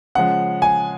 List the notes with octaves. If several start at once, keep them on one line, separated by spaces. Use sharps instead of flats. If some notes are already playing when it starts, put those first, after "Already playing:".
C#3 F3 G#3 F#5
G#5